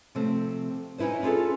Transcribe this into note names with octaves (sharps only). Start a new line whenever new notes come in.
C3 F3 A3 C4
C#4 D#4 E4 B4 C5
C#4 F4 G#4 A4 B4